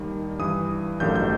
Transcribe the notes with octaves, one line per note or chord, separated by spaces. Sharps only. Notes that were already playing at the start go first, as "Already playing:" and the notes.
Already playing: D#2 D#3 G3
G2 E3 G3 D#6
A1 G2 D#3 F#3 A3 G6
G6